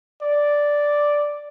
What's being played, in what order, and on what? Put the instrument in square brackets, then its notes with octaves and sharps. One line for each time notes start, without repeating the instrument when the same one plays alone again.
[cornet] D5